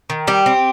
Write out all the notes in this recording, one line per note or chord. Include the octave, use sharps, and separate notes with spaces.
D#3
G3 G4
C4